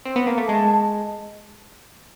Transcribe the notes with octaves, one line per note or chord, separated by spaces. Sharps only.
C4
B3
A#3
A3
G#3 A5